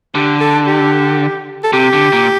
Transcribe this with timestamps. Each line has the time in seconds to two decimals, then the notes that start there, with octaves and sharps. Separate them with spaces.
0.15 D3 G4
0.41 A4
0.67 G4
1.64 A4
1.73 C3 G4
1.93 D3
2.13 A#2